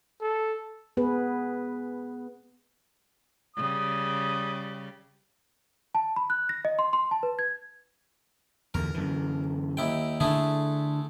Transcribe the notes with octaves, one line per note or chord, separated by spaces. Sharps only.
A4
B3 G#4 B4
C#3 G3 D#6
A5
B5
F#6
A#6
D#5
C6
C6
A5
B4
G#6
E2 D3 A#4
F#2 D3 E3
D#2 E4 G5
D3 A3 C4 D4 E4 G#4